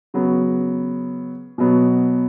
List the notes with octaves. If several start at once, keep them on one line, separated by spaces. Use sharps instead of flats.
C#3 F#3 B3
B2 F#3 B3